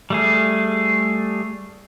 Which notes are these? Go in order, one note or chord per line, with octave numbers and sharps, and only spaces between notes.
G3 A3 G#4